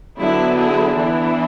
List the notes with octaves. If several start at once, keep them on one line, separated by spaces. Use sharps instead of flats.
D3 F#3 B3 E4
E4 G#4
E3 B3 D4 E4